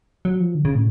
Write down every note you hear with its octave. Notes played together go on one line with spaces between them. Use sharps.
F#3
F3
D3
C#3
A2